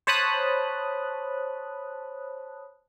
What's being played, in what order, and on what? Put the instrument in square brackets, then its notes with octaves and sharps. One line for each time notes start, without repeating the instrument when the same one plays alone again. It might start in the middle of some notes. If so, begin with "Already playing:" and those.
[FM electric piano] C5 C#5 A5 B5 D#6 F#6